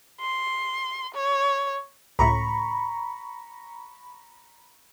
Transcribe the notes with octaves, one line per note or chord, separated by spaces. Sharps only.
C6
C#5
C#2 A2 A#5 B5 C#6